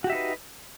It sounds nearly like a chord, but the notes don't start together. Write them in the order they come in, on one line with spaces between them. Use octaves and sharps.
F#4 G4 E5 D#4 B4